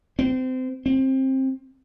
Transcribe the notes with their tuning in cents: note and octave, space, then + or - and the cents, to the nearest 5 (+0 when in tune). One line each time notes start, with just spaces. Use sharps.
C4 -25
C4 +20